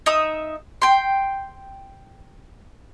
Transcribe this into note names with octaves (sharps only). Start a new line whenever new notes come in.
D#4 E5 D#6
G5 C6